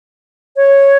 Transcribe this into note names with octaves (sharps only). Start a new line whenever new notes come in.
C#5